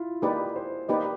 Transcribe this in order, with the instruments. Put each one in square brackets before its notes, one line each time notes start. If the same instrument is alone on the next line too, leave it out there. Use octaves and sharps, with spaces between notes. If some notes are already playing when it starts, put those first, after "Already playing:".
Already playing: [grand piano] E4 F4
[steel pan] A#3 D#4 G4 B4 D5 [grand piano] G#4
[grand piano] C5
[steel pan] A#3 D#4 G4 B4 D5 [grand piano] D#5